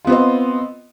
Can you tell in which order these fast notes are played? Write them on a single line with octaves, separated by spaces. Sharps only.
F4 B3 C4 D#5